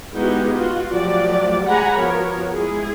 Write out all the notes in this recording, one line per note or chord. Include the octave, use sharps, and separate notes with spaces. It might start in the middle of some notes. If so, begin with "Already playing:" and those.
G#3 B3 D#4 E4 F#4 G4
F4 F#4
F3 F#3 A3 F#4 G4 D5
G#3 G4 F#5 G#5 A#5 B5
F3 B3 F#4 A#4 C#5
G#3 E4 G#4